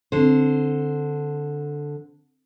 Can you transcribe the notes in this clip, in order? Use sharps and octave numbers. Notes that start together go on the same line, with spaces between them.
D3 C4 D4 A4 C5